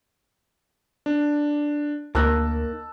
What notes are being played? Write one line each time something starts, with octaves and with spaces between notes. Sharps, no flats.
D4
D2 A#3 D#4 A#4 A5 E6 F#6